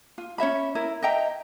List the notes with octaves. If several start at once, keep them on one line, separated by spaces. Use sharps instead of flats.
F4
C#4 C#5 E5 B5
E4 A#4
D#5 E5 G5 A#5